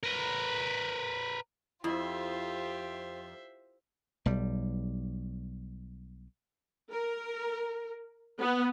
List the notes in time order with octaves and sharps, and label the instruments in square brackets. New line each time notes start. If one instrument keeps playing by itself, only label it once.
[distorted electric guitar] A#4 B4
[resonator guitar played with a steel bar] F2 [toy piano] E4 D#5 [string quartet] F4 G4 [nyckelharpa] C5 E5
[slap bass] B1 G3
[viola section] A#4
B3